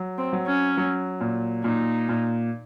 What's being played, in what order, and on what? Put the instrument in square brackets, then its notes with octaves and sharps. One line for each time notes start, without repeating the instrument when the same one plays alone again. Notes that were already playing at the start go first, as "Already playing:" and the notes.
Already playing: [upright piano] F#3
[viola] C4
[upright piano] F#3
[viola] C#4
[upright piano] F#3
A#2
[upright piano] A#2 [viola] D#4
[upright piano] A#2